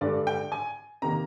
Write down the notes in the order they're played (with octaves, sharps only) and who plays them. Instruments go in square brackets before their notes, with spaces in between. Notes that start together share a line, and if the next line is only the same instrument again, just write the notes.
[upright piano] G2 D3 G#3 D4 D5
G5
G#5
C3 D#3 A#3 A#5